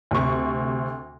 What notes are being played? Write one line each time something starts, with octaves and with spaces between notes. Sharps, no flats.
D2 C3 C#6